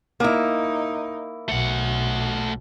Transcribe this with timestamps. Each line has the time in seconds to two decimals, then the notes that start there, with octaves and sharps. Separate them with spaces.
0.20 A#3 D#4 E4
1.49 B1 A3 F#5